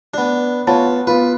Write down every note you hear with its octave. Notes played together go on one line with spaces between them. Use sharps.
B3 D4
B3 F4 C#5 A5
B3 F4 B4